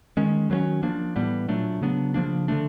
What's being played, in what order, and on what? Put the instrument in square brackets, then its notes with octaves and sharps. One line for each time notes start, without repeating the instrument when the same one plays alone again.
[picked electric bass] D#3 G#3 C#4
D#3 F#3 A#3 C#4
F3 A#3 D4
A2 E3 G3 B3
A#2 F#3 A3 D4
C#3 F#3 B3 D4
C#3 F3 A#3 D4
D3 F3 A3 D4